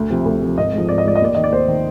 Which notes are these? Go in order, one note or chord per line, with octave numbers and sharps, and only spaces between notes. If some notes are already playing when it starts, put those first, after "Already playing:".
Already playing: D2
C3 F3
D2
C3 F3
G#1 D#5
G#2 F3
G#1 D5
D#5
G#2 F3 D5
D#5
D#2 D5
D#3 D#5
D5
D#2 C5
D#3